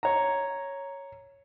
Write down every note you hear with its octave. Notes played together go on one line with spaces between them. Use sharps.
C#5 A#5